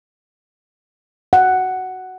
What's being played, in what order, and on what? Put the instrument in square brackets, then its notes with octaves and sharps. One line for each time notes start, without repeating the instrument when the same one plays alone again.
[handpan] F#5